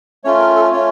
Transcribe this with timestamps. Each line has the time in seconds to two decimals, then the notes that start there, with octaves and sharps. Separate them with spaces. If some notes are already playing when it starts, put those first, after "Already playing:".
0.24 A3 C#4 F4 C#5
0.40 A#4
0.56 A4
0.72 A3 C#4 F4 C#5